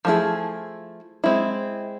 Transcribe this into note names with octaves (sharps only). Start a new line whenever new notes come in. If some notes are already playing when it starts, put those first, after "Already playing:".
F3 A3 C#4 E4 G#4
G#3 C4 E4